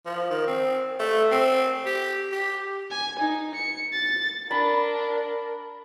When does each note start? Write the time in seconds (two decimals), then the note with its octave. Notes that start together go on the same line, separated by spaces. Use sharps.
0.06 F3
0.30 D#3
0.47 C4
1.00 A3
1.31 C4
1.86 G4
2.32 G4
2.91 G#5
3.19 D#4
3.55 C#7
3.93 A6
4.51 D4 A#4 B5